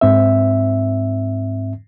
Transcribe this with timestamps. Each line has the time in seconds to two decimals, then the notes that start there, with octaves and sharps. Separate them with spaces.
0.01 G#2 C4 E5